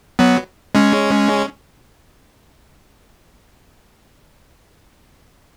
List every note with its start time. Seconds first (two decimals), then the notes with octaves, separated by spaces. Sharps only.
0.19 F#3 B3
0.75 G#3 C#4